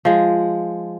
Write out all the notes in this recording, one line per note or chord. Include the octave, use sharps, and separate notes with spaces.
F3 G#3